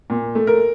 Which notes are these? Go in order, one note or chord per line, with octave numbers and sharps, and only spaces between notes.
A#2
A3
A#4